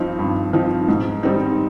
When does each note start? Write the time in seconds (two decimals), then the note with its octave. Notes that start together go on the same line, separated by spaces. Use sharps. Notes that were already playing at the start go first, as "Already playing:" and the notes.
Already playing: G2 F3 C4 D#4
0.19 G2
0.53 F3 C4 D#4
0.88 G#2
1.23 G3 C4 D#4